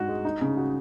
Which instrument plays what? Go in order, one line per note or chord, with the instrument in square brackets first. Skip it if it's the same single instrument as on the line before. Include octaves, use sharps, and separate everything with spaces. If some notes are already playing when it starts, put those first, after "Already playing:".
Already playing: [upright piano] G#2 D#4 F#4
G#3
D#4
C#3
F#4